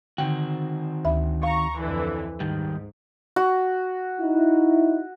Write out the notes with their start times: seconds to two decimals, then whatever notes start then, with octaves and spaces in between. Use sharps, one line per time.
0.18 D3 D#3 C4 F#4 G5
1.05 D2 E5 B5
1.43 F5 A#5 C#6
1.79 F2 D3 E3
2.40 G#2 D#3 G3
3.36 F#4
4.20 D#4 E4